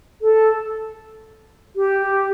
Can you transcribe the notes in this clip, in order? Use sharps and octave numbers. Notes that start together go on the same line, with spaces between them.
A4
G4